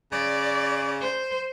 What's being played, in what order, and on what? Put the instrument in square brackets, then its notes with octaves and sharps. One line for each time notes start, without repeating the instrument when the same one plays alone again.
[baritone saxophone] C#3 [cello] D5
[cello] C5